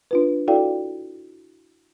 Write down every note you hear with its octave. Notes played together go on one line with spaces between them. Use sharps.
D4 F4 B4
E4 F#4 A4 D5 F5 G5